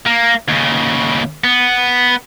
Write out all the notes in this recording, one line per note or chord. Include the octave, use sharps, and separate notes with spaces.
A#3
D#2 C#3
B3